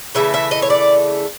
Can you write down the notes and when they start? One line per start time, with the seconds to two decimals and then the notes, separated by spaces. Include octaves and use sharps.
0.15 C#3 E3 A3 E5
0.34 E5
0.51 D#5
0.62 C#5
0.70 D5